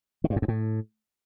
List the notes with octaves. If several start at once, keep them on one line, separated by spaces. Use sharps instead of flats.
D#3
G2
G#2
F#2
A2